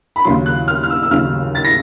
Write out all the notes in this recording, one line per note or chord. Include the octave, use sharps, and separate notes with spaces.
B5
D#2 C#3 F#3 C6
F#6
F6
F6
E6
E6
D#2 C#3 F#3 F6
A6
A#6